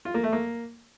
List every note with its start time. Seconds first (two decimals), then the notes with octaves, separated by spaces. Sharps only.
0.05 F4
0.14 A#3
0.23 A3
0.33 A#3